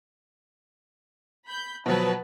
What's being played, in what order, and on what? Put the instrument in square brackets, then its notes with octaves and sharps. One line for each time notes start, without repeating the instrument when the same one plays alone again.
[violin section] B5 G6
[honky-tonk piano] B2 F3 F#3 [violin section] B4 A5